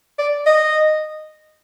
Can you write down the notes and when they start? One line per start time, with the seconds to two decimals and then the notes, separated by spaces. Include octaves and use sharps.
0.19 D5
0.46 D#5